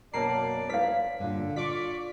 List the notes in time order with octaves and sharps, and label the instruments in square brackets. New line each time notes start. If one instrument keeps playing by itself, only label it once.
[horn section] F#2 D5 [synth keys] B2 A#3 C7 [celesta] C#5 A5 A#5
[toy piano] B4 F5 [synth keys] B6
[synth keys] G2 A#2 [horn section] D3
[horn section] F4 D5 [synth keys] C#6 D6 B6